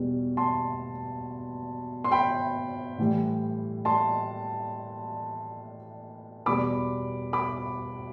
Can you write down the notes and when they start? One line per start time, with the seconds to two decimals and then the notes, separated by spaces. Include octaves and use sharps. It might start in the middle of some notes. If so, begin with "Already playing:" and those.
Already playing: E2 B2 G3
0.37 A5 C6
2.04 C6
2.12 G5 B5
2.98 A2 E3 G3
3.85 A5 C6
6.46 E2 B2 G3 B5 D6
7.33 B5 D6